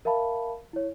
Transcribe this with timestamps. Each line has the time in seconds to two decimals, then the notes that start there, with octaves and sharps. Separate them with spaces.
0.05 A#4 E5 F5 A5 B5
0.73 E4 C#5